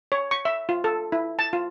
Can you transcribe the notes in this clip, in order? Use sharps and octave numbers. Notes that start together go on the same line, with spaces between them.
C#5
C#6
E5
F4
A4
E4
A5
F4